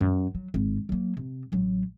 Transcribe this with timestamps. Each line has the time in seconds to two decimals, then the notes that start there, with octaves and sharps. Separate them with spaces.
0.01 F#2
0.35 F#3
0.54 G#1
0.89 F#3 A#3
1.17 C3
1.52 A1 F#3